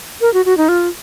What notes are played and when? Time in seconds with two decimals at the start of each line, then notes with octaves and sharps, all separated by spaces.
0.21 A#4
0.34 F#4
0.45 F#4
0.57 D#4
0.69 F4